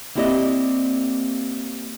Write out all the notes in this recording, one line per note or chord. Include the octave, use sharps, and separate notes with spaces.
A#3 C4 E4 G4 D5 D#5